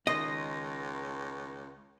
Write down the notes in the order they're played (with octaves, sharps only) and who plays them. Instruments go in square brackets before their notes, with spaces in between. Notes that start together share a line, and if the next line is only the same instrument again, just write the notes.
[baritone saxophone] C#2 [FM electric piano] D#3 C6 A#6 [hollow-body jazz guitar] D#5